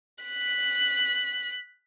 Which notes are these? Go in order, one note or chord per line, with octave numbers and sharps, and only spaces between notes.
F#6 B6